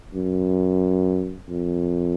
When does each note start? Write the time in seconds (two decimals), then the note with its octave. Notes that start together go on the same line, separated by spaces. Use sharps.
0.15 F#2
1.50 F2